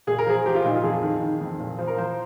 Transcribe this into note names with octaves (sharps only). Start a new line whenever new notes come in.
A#2 G#4
A#4
F3 G#4
F3 G4
F4
A#2 D#4
F4
F2 G#4
D#3
D#3
F2
A#2
F3
A#4
F3 C5